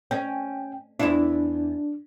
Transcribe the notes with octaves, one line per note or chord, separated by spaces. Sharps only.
C#4 G5
E2 D4 E4